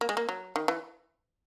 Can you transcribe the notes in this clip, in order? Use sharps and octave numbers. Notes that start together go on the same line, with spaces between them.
A#3
G#3
A#3
F#3
D#3
E3